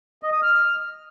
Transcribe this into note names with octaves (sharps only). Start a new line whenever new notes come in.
D#5
D#6
F6